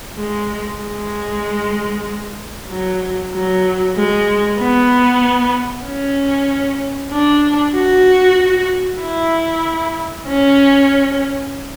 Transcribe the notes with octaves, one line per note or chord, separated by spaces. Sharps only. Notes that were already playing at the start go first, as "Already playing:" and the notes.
G#3
G#3
F#3
F#3
G#3
B3
C#4
D4
F#4
E4
C#4